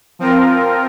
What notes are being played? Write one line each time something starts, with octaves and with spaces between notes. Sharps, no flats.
F3 C4 F4 A#4